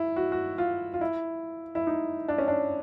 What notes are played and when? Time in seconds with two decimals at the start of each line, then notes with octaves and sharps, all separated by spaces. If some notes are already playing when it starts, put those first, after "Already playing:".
Already playing: E4
0.16 F#4
0.32 F#4
0.58 F4
0.94 F4
1.01 E4
1.75 E4
1.87 D#4
2.28 D4
2.38 C#4
2.48 D4